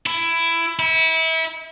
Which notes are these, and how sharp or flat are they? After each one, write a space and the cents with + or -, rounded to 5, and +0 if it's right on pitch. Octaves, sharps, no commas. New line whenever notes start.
E4 +15
E4 -30